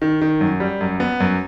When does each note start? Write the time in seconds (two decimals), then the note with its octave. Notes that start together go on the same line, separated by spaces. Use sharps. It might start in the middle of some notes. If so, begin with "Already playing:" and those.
0.02 D#3
0.21 D#3
0.41 F#2
0.60 G3
0.81 F#2
1.00 B3
1.20 F#2